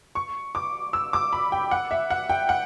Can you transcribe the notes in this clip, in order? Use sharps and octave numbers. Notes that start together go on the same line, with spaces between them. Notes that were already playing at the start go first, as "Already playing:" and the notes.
C#6
D6
E6
D6
B5
G5
F#5
E5
F#5
G5
F#5